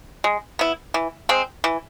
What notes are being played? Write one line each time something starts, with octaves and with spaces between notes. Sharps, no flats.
G#3
B3 E4
E3
G#3 C4
E3